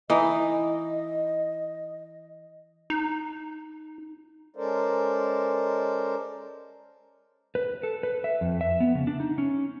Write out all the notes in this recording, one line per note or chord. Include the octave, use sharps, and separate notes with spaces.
E3 D#4 D#5
D#4
G#3 C#4 A4 A#4 C5 D5
B4
A4
B4
E5
F2
E5
B3
C#3
D4
D#4
C#4